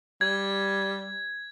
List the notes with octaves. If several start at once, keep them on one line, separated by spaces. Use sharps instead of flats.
G3 G#6